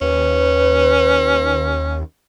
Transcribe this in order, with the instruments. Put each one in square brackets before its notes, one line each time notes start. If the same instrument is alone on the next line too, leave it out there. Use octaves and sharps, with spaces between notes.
[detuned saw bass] D#2 [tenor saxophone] C#4 [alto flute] B4